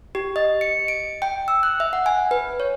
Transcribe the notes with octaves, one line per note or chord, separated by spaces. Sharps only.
G4
D#5
C#7
D7
G5
E6
F#6
E5
F#5
G#5
B4
C#5